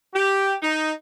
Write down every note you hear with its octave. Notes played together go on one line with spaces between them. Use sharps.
G4
D#4